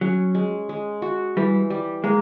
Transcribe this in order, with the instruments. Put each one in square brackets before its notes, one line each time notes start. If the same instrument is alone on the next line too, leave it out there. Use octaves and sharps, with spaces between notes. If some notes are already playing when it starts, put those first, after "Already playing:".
[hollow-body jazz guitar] F#3 [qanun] C#4
[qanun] G#3
G#3
F#4
[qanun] E3 [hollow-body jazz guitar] G3
[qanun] G3
[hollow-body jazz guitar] G#3 [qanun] A#3